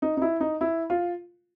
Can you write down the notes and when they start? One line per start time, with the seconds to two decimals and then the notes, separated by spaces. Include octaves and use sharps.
0.02 D#4
0.17 D#4
0.22 E4
0.40 D#4
0.61 E4
0.90 F4